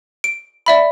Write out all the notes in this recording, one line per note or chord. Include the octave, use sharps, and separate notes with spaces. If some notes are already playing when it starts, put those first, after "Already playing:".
D7
D5 E5 B5